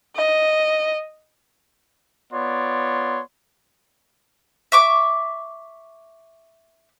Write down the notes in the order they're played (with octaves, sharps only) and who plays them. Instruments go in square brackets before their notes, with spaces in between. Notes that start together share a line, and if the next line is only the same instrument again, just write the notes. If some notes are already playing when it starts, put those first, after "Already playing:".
[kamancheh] D#5
[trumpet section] B3 F4 C#5 D5 C6
[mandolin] E5 C#6 D6